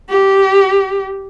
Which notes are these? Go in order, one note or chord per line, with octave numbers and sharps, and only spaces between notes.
G4